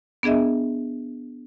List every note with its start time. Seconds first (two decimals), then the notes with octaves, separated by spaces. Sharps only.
0.23 B3 D4 G#4 D#5 E5